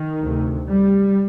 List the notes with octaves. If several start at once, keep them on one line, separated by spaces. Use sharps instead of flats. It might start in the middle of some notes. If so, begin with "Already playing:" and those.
Already playing: D#3
D2 C3
G3